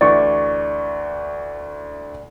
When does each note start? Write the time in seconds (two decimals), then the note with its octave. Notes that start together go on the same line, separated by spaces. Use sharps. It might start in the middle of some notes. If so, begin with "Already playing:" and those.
0.01 D2 E3 D5 C#6